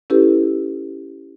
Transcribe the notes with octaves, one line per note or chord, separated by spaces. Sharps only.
C#4 E4 G4 A4 B4